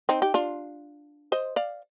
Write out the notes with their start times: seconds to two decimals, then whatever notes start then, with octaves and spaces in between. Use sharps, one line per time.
0.09 C4 D#4
0.22 G4
0.34 D4 F4
1.32 C5 D#5
1.56 D5 F5